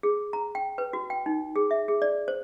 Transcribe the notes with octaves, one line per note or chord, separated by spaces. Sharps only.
G#4
A#5
G5
B4
F#4
G5
D#4
G#4
E5
G#4
D5
C5